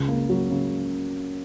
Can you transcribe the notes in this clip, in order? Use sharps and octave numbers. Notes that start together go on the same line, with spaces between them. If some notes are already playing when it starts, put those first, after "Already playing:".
Already playing: C#2
A#3
F#3
C#3